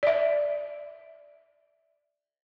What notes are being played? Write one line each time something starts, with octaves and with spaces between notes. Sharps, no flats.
D5 E5